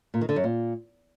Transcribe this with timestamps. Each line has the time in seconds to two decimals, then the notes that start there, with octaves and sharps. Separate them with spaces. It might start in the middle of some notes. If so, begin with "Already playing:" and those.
0.14 A#2
0.21 D#3
0.29 D3
0.36 F#2
0.44 A#2